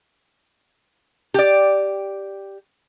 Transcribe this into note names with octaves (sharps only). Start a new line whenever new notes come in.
G4 D5